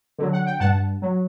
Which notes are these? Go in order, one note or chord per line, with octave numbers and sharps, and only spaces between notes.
D3 F#3
F#5
G5
G2 F#5 A5
F#3